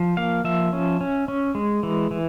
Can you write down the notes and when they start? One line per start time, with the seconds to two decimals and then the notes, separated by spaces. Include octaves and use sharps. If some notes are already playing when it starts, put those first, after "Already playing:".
Already playing: F3
0.17 A#3 F5
0.44 F3 E5
0.73 C#4
1.01 C#4
1.28 C#4
1.55 G#3
1.83 E3
2.11 E3